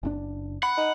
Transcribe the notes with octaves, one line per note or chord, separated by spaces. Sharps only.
F#1 A#2 D4
F#5 B5
D#4